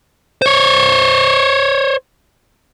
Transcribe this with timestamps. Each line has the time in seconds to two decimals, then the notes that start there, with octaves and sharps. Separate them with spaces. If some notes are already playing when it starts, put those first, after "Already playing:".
0.42 C5 C#5